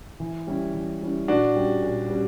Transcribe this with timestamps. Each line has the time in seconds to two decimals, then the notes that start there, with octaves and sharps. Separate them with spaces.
0.20 E3
0.47 G3 C#4 E4
0.74 E3
1.01 G3 C#4 E4
1.28 A#2 D4 F#4
1.56 G3 C#4 G4
1.82 A#2
2.10 G3 C#4 G4